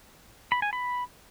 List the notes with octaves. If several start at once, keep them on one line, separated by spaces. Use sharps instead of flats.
B5
G#5
B5